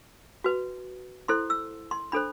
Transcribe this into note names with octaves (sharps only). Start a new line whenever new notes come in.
F#4 B4
E4 A4 C5 C6
E6
C6
D4 A4 C5 B5